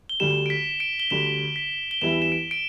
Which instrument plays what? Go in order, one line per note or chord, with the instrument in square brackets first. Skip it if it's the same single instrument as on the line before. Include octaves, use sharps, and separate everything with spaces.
[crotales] G7
[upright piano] D2 D3 G3 [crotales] E7
[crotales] D7
B6
D7
G7
[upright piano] D2 D3 G3 [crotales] E7
[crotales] B6
G7
[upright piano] E2 E3 G3 E4 [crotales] E7
[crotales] E7
D7
D7